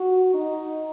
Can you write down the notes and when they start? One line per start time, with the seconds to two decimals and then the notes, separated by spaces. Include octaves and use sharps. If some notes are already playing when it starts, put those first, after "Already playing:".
Already playing: F#4
0.34 D#4